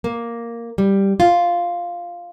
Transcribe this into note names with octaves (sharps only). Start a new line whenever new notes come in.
A#3
G3
F4